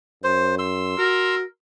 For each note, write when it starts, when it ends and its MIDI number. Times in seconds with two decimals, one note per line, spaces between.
0.24 0.94 42
0.24 0.55 72
0.59 1.35 84
0.59 1.35 88
0.98 1.44 66
0.98 1.41 70